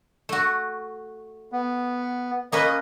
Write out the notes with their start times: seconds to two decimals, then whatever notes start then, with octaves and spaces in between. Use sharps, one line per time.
0.29 A3 F#4
1.52 B3
2.52 A#3 C#4 B4 D#5 D#6